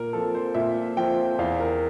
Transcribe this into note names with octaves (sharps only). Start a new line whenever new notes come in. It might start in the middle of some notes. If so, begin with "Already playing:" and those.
Already playing: A#2 A#4
F3 C4 A4
C5
A#2 E5
F3 C4 G5
E2 F5
A#4